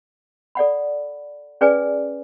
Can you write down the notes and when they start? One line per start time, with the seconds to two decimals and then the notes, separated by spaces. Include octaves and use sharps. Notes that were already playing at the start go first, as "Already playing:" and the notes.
0.55 A4 D5 F#5 B5
1.61 C#4 G#4 B4 D5 G#5